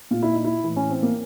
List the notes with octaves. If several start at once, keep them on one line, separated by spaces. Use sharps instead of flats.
A#2 F4
E4
D#4
E4
A2 E3
C#4
C4
A#3